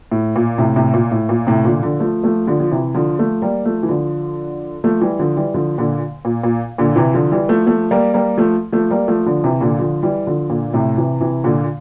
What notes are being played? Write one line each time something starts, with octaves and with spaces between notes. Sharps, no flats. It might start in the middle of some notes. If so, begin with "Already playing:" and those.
A2
A#2
A2 C3
A2 C3
A#2
A2
A#2
A2 C3
A#2 D3
D3 F3
F3 A3
F3 A3
D3 F3
F3
C3 E3
D3 F3
F3 A3
G3 A#3
F3 A3
E3
D3 F3
F3 A3
E3 G3
D3 F3
E3 G3
D3 F3
A#2 D3
A#2
A#2
A#2 D3
C3 E3
D3 F3
E3 G3
F3 A3
F3 A3
G3 A#3
G3 A#3
F3 A3
F3 A3
G3 A#3
F3 A3
D3 F3
C3 E3
A#2 D3
D3 F3
E3 G3
D3 F3
A#2 D3
A2 C3
C3 E3
C3 E3
A#2 D3